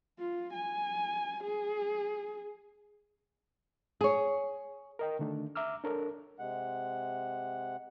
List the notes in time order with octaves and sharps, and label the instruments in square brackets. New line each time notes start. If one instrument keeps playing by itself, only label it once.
[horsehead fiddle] F4
G#5
G#4
[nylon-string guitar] G#4 C#5
[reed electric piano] A#4 D#5 G5
D3 D#3 A3 D4
E5 A#5 D6 E6 F6
D4 A4 A#4 C#5
[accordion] C3 G#3 F#5